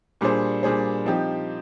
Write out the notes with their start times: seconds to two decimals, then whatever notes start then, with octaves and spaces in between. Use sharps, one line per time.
0.21 A#2 G3 D4 G#4 C5
0.63 A#2 G3 D4 G#4 C5
1.05 F3 C4 D#4 G4